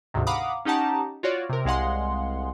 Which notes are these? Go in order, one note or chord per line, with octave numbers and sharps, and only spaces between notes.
D2 G#2 C3 D#3
F5 F#5 A#5 B5 D6 D#6
C#4 D#4 G4 F#5 A5 A#5
F4 F#4 C#5 D5
C3 A#4
C2 G#3 F5 F#5 C6